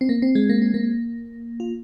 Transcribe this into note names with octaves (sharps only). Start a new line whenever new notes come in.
C4
A#3
C4
G#3
A#3
C4
A#3
F4